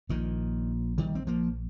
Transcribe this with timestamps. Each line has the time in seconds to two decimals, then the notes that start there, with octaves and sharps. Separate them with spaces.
0.09 A#1 A#2 D#3
0.98 D#3 G3
1.15 C4
1.27 F3 A#3